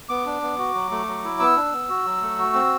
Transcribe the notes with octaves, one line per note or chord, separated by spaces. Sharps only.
B3 D6
D4
B3
F#4
F#3
A3
F#3
E4
B3 E6
D4
B3
F#4
F#3
A3
F#4
C4